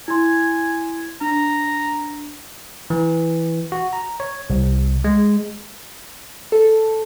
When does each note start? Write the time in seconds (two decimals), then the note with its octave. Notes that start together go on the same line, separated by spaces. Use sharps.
0.08 E4 G#5 C6
1.21 D4 A#5
2.90 E3
3.72 F#4
3.93 A#5
4.20 C#5
4.50 C2
5.04 G#3
6.52 A4